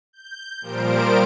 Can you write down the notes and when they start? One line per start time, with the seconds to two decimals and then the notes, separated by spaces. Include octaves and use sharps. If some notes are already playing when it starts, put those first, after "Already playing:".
0.13 G6
0.61 A#2 F3 G3 A#4 C5 D7